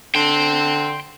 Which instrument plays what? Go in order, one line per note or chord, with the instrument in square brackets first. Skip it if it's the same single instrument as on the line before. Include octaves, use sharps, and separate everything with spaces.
[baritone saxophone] D3 [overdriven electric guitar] G5 C6